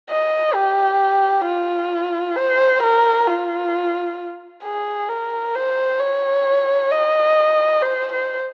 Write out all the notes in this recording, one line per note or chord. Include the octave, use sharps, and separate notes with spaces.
D#5
G4
F4
C5
A#4
F4
G#4
A#4
C5
C#5
D#5
C5
C5